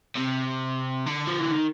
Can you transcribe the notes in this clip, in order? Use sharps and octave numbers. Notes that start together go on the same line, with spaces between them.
C3
D3
F3
E3
D#3